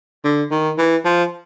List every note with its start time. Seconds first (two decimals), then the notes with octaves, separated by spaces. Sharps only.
0.24 D3
0.51 D#3
0.78 E3
1.05 F3